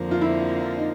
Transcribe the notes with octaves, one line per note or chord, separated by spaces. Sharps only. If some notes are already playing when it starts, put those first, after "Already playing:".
Already playing: F2 D3 F3 A#3
F4
E4
D#4